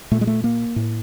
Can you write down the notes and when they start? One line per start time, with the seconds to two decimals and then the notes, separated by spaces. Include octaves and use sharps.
0.11 A#2 A3
0.21 G#3
0.27 A3
0.44 A#3
0.76 A2